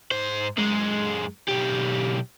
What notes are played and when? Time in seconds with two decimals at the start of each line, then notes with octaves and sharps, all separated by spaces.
0.12 G#2 C5
0.58 F#2 G#3
1.48 B1 G4